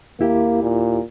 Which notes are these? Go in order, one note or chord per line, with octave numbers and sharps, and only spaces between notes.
D#2 A#3 E4 G4
A#2